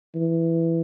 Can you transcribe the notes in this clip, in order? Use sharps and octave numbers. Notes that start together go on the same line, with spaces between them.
E3